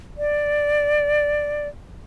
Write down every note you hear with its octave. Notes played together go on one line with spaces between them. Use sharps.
D5